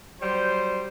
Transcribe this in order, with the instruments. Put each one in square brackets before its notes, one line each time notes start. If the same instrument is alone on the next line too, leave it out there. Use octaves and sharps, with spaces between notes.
[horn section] F#3 G3 C5